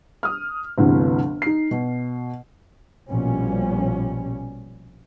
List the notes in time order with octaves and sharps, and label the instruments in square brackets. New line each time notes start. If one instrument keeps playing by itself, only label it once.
[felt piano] D#6 F6
G1 D2 C3 E3
D#4 C7
B2
[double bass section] A#1 B2 F3 G3 C#4